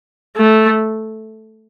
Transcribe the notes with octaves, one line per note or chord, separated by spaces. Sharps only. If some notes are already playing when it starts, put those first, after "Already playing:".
A3